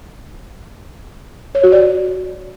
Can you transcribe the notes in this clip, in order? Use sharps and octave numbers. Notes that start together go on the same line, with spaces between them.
C#5
F#4
D5